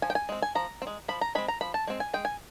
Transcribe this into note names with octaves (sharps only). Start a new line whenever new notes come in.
F3 G#5
G5
G#5
G#3 C4
G#5
F3 A#5
C4
G#3
F3 B5
A#5
G#3 C4 B5
A#5
F3 B5
A5
G#3 C4
G#5
G#3 G5
G#5